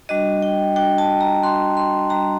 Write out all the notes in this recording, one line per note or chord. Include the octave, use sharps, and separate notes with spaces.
G3 D4 F#4 D#5
G5
G3 D4 F#4 G5
A5
A#5
G3 D4 F#4 C6
C6
G3 D4 F#4 A#5